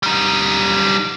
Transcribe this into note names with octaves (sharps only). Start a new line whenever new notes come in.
G3 D#4